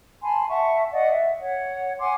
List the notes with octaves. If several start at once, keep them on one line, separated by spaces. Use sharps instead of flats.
G#5 A5 B5 C6
E5 F#5 A5 C#6
D5 D#5 F5 F#5
E5
C#5 F#5
F#5 G#5 C6 D6